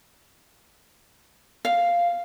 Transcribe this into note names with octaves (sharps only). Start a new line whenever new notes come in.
F5